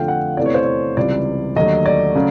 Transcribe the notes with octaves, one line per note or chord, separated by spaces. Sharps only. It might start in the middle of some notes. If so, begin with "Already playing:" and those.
Already playing: F2 D3 F3 A3 F5 G5
F#5
E2 C3 E3 A3 D5
C#5
C5
C#5
C#2 C3 E3 G3 D5
D#2 D3 F#3 A3 D#5
D5
C#3 F#3 A3